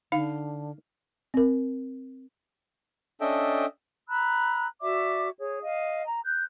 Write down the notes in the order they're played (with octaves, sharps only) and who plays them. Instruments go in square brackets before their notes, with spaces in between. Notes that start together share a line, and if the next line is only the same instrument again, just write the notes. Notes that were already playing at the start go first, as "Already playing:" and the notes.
[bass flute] D3 [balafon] D#4 [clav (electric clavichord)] F5
[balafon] C4 A#4
[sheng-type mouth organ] C#4 D4 A4 D#5 E5 G5
[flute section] A#5 B5 E6 F#6
F#4 D5 E5 D6
G#4 C#5
D#5 F5
A#5
F#6 G6